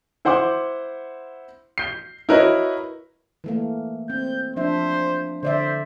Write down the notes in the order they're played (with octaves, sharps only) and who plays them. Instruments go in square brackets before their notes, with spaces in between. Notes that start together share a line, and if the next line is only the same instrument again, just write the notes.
[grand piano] E4 C5 F#5 C6 D6
G6 C7
E4 F#4 A#4 B4 C#5 D#5
[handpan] E3 A3 A#3
[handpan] C4 [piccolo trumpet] G6
[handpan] F3 D4 E5 [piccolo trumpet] C5
[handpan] D3 D5 E5 [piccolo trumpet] C5